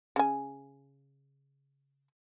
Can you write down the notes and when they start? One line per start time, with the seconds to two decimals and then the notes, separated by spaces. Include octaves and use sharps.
0.16 C#3 G#5